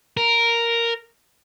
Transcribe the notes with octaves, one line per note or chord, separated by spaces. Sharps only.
A#4